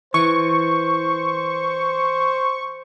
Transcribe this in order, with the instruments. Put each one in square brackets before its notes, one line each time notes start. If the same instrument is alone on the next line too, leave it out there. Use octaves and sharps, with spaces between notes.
[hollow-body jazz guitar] E3 [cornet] C5 [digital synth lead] C#6